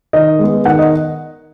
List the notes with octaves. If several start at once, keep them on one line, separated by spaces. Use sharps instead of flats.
D#3 D#5
G#3 B3
D#3 F#5
D#5